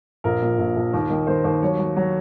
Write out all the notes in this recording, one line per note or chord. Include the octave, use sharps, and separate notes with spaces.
A#1 A#4
A#2
A#1
A#1
D#2
D#3
D#3 C5
D#2 C5
F#3 C#5
F#3
F#3